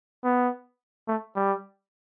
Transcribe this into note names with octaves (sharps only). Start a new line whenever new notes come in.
B3
A3
G3